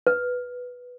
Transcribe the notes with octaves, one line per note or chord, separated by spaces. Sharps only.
B4